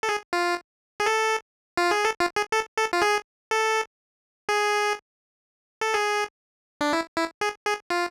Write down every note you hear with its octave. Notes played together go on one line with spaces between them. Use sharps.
A4
G#4
F4
G#4
A4
F4
G#4
A4
F4
G#4
A4
A4
F4
G#4
A4
G#4
A4
G#4
D4
E4
E4
G#4
G#4
F4